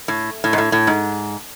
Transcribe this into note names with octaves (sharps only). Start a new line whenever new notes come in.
A2
A2
G#2
A2
A2
G#2